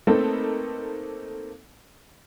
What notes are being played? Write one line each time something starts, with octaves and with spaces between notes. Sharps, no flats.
A3 A#3 C4 D#4 A4 B4